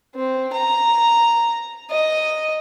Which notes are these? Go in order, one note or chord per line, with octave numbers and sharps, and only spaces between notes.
C4
A#5
D#5